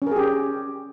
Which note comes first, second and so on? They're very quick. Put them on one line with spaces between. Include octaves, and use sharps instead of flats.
C#4 A#4 G#4 G4